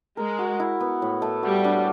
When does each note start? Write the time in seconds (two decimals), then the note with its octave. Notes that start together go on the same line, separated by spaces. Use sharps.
0.17 G#3 A#4
0.39 F#4
0.60 E4
0.80 B3
1.02 A2
1.22 A3
1.43 G3 F#4
1.64 D4